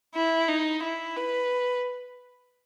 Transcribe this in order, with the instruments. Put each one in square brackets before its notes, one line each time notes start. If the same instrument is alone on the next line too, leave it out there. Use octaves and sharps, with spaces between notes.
[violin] E4
D#4
E4
B4